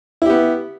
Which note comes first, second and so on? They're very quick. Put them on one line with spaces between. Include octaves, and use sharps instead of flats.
E4 G4 B3